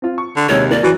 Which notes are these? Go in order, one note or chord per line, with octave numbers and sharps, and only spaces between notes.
C4 F4
C#6
D3
D#2 C3 G#3 C#5
A#3 D5
F#2 E3 F#4